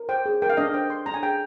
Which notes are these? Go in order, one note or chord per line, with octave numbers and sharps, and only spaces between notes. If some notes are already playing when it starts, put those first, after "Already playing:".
Already playing: A#4
C5 G5
G#4
A#4 G5
F5
D4 D#5
F5
C5 G5
C5 C6
D4 A#5
G#5
G#4 G5